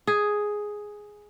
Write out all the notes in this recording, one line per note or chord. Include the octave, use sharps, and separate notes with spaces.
G#4